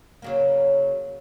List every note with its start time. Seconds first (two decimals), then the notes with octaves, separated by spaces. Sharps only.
0.22 C#3 F#3 A#3